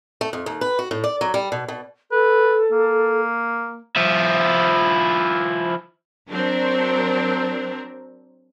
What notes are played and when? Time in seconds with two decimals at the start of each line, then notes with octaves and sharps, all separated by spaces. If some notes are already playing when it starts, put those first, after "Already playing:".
0.21 A3
0.33 F2
0.46 D#2
0.61 B4
0.79 F#4
0.91 A2
1.04 D5
1.21 F#3
1.34 G3
1.52 B2
1.68 B2
2.12 A4 B4
2.71 A#3
3.96 F3 E4
6.30 F#3 C4 D4 A#4